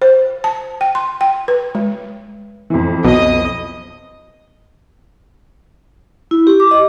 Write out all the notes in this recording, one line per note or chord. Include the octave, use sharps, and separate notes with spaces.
C5
A5
G5
C6
G5
B4
G#3
F2 E3
B1 D#5 D#6
E4
G4
D6
D#5